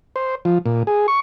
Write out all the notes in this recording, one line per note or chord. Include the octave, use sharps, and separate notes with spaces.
C5
F3
A#2
G#4
C#6